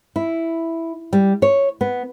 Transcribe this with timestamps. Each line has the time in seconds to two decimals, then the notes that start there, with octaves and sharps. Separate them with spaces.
0.16 E4
1.13 G3
1.42 C#5
1.81 B3